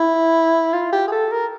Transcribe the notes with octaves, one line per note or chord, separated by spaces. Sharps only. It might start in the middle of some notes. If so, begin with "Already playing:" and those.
Already playing: E4
F4
G4
G#4
A4
A#4